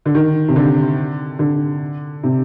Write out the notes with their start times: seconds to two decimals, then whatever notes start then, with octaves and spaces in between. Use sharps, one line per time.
0.06 D3
0.15 D#3
0.48 C3
0.56 D3
1.39 D3
2.23 C3